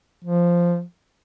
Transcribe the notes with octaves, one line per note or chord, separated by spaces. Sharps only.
F3